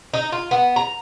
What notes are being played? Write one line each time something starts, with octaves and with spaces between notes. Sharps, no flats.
D#4
F4
B3
A#5